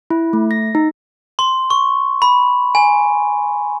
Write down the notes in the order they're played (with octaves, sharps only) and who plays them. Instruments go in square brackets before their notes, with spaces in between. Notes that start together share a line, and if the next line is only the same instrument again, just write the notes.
[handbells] E4
A3
A#6
D#4
[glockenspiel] C6
C#6
B5
G#5